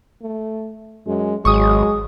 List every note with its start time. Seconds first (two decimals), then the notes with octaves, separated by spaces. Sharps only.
0.22 A3
1.07 F#2 G#3
1.45 G#1 F#3 G#3 C#6 D#6